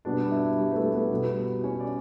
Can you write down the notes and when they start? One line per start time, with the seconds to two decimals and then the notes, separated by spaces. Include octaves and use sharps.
0.05 B2 G3 B3 D4
0.31 E4
0.58 G3 G4
0.72 B4
0.76 A3 A4
0.93 B3 B4
1.11 B2 G3 B3
1.64 C#4 C#5
1.80 D5